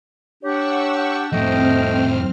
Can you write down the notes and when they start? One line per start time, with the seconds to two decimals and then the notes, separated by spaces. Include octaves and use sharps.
0.44 D4 G4 C#5 F#5 C#6 E6
1.32 F2 A2 A3 C4 D#5 G5 F6